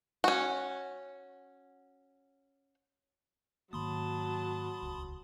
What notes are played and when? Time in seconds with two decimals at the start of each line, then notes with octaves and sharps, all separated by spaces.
0.24 C#4 F#4
3.73 G#2 D#3 F#3 A#3 A5 B5 C6 D#6
4.82 D#1 C#2